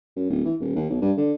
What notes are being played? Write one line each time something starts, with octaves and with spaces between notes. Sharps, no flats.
F#2
D1
E3
D#1
D#2
B1
G2
D3